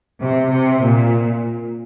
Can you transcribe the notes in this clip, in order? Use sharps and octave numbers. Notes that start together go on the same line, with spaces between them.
C3
C3
A#2